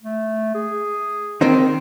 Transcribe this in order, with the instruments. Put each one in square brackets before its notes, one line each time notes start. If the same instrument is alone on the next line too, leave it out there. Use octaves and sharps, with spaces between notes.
[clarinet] A3
G#4
[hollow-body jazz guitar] D#3 C4 D#4